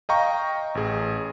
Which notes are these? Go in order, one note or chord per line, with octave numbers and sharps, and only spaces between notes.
D#5 F5 G5 A#5 C#6
A1 G#4